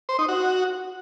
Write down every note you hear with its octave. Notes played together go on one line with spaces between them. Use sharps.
C5
D#4
F#4